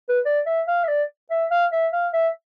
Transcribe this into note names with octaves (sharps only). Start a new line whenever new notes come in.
B4
D5
E5
F5
E5
D5
E5
F5
E5
F5
E5